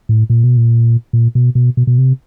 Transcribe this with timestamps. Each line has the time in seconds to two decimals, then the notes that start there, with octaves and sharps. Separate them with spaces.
0.09 A2
0.30 A#2
0.43 B2
0.57 A#2
1.13 A#2
1.35 B2
1.55 B2
1.77 B2
1.87 B2
1.98 C3